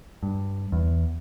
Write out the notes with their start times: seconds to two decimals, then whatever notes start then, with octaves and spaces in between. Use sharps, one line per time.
0.23 G2
0.72 E2